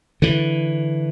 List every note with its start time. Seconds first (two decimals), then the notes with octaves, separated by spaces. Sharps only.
0.22 D3 E3